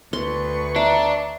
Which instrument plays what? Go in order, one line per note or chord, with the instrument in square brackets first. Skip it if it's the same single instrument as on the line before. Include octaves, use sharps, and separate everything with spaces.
[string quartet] D2 B4 C#6 [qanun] C6
[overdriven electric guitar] D4 [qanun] E5 [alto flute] A#5